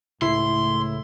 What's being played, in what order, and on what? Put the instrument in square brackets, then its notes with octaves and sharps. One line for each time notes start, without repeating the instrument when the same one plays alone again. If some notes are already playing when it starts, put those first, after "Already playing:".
[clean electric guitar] C#2 [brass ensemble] A2 [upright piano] E4 [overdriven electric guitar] C6